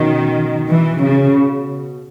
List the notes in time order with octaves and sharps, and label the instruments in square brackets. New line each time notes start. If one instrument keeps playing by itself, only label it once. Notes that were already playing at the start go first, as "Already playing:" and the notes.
Already playing: [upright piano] B2 C#4 [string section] D#3
[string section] E3
C#3